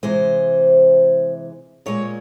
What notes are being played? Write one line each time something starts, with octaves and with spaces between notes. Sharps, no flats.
C3 E3 G#3 C5
A#2 G#3 C#5